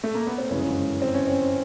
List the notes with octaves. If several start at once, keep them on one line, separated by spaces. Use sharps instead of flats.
A3
A#3
B3
C4
G1 F#2 C#3 E3 G#3 C#4
C4
C#4
C4